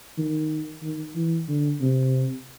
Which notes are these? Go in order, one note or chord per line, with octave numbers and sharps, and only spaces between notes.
D#3
D#3
E3
D3
C3